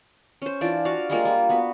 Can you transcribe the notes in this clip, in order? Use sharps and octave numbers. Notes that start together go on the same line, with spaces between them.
C#4 C5
E3 D4 F4 D5
F#4 D5 F5
G3 G#3 A#3 F4
G3
B3 F#4 B4